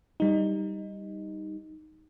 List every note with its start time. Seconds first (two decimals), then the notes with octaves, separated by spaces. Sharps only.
0.20 G3 D#4